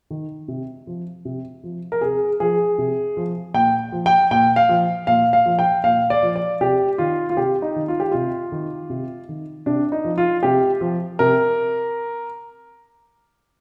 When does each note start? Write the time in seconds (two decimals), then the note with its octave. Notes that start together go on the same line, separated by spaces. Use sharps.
0.11 D#3
0.48 C3
0.87 F3
1.25 C3
1.64 F3
1.92 A#4
2.01 C3 G#4
2.40 F3 G#4
2.78 C3
3.17 F3
3.54 A#2 G5
3.92 F3
4.06 G5
4.31 A#2 G5
4.56 F5
4.69 F3
5.07 A#2 F5
5.33 F5
5.46 F3
5.59 G5
5.84 A#2 F5
6.10 D5
6.23 F3
6.36 D5
6.61 C3 G4
6.98 D#3 F4
7.30 F4
7.37 C3 G4
7.62 D#4
7.76 D#3
7.88 F4
8.00 G4
8.12 C3 F4
8.52 D#3
8.90 C3
9.29 D#3
9.66 C3 D4
9.92 D#4
10.04 F3
10.18 F4
10.43 C3 G4
10.81 F3
11.19 C3 A#4